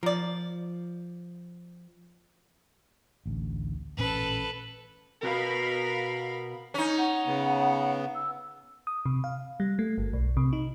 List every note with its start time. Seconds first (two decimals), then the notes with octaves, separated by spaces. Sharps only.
0.03 F3 A#4 D5
3.26 A1 D2
3.97 A1 A#2 C#4 A4 B4
5.23 B2 F#4 A#4 B4 F5 B5
6.74 C#4 D#4
6.98 F#5
7.27 C#3 B3
8.15 E6
8.87 D#6
9.06 C3
9.24 F5
9.60 G3
9.79 A3
9.98 G1
10.13 B1
10.37 C3
10.53 D#4